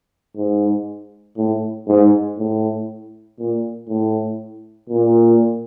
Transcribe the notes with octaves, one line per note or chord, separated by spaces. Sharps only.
G#2
A2
G#2
A2
A#2
A2
A#2